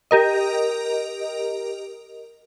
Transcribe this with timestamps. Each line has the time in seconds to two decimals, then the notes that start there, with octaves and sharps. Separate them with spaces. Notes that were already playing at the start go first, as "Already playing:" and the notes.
0.11 G4 A#4 D#5